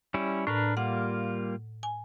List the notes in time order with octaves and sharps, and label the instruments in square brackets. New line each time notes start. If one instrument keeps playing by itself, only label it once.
[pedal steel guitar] G3 C#4 E4
[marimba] A2 [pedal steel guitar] D4 A#4 B4
[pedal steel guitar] G3 A#3 F4 [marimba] F#5
[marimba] G#5